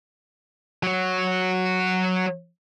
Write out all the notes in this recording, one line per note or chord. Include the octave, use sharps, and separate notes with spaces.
F#3 F#4